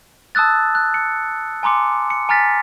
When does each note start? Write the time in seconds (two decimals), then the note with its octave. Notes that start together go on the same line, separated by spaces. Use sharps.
0.35 A5 D#6 E6 F#6 A6
0.75 F#6
0.94 C#7
1.63 G#5 A#5 C6 D6 C#7
2.10 C#7
2.29 G#5 A#5 F6 A6 B6